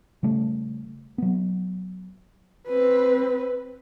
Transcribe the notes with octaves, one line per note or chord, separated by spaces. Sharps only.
C#3 G3 A3
F#3 B3
C4 B4